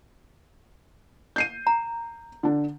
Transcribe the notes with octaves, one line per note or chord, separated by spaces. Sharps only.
G6 C7 D#7
A#5
D3 D4